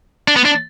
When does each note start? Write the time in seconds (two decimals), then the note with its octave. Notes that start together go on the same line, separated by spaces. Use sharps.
0.28 D4
0.36 B3
0.45 D4